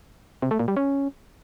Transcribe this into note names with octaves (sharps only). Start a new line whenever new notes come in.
C3
A3
A#2
G3
C#4